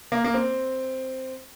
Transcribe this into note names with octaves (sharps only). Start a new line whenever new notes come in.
A#3
A#3
C4